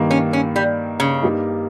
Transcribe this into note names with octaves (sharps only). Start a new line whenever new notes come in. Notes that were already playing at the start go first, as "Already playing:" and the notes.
Already playing: G2 D#3 A#3
C#4
C#4
G3
C#3
G2 G3 A#3 D#4